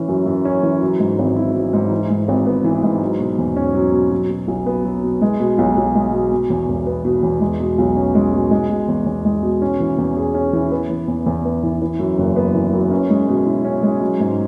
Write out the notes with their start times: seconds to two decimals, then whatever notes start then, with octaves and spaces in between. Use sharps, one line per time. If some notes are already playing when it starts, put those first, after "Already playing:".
Already playing: E3 C#4
0.08 F#2
0.26 F#2
0.45 C#4
0.63 E3
0.81 F#3
1.00 G#2
1.19 G#1
1.36 E4
1.55 F#3
1.73 G#2
1.91 E3
2.10 G#2
2.28 G#1
2.47 B3
2.64 E3
2.83 G#2
3.02 F#3
3.19 B2
3.38 E2
3.56 C#4
3.75 F#3
3.93 B2
4.11 F#3
4.30 B2
4.48 B1
4.66 B3
4.85 F#3
5.03 B2
5.22 G#3
5.40 B2
5.58 B1
5.76 B1
5.95 G#3
6.13 B2
6.32 B2
6.50 E2
6.68 E1
6.87 B3
7.05 B2
7.23 E2
7.41 G#3
7.60 B2
7.78 B1
7.96 C#4
8.15 G#3
8.33 B2
8.51 G#3
8.69 B2
8.88 E2
9.06 E2
9.25 G#3
9.43 B2
9.62 C#4
9.80 E3
9.98 E2
10.17 G#4
10.34 C#4
10.53 E3
10.71 B3
10.90 E3
11.08 E2
11.26 E2
11.45 B3
11.63 E3
11.81 E3
11.99 F#2
12.18 F#1
12.36 B3
12.55 E3
12.73 F#2
12.91 C#4
13.10 G#3
13.28 B2
13.47 E4
13.65 C#4
13.83 G#3
14.02 F#3
14.20 G#2